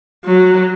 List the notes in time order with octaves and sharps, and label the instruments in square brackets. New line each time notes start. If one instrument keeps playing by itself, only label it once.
[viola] F#3